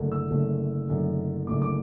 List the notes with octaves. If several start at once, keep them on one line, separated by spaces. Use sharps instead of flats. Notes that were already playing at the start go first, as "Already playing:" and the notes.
Already playing: F#1 F#2 D3 A3
E6
F#1 F#2 D3 A3
F#1 F#2 D3 A3
F#1 F#2 D3 A3 D6
D6